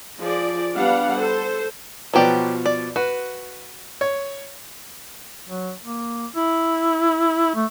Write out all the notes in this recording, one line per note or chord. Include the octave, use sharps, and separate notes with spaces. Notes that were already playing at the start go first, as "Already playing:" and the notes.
F3 G#4 D5
G3 B3 D4 G4 F5 F#5
A4 C5
B2 F3 F#3 B3 G4 D5
D5
F#4 B4
C#5
F#3
A#3
E4
A3